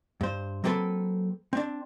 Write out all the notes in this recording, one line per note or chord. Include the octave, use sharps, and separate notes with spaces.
G2 C5
F#3 A#3 C4 A4 B4
C4 D4